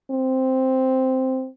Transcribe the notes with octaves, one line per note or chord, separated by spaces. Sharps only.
C4